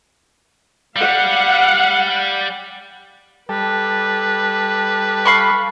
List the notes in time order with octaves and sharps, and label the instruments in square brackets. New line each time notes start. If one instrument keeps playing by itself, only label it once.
[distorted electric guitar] G3 [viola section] F5 F#5
[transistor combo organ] G3 A4 [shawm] B4
[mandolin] F5 B5 C#6